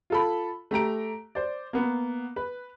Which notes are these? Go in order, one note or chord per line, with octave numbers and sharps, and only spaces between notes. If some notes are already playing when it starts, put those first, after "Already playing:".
F4 A4 B5
A3 G4 A#5 D7
C5 D5
A#3 B3
B4